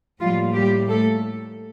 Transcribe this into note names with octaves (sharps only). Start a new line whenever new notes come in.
A2 F3 G3 A#3 F4
G3 G4
A3 A4